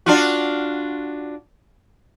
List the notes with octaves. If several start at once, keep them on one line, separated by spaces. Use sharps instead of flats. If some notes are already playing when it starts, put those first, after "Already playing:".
D4 F4 F#4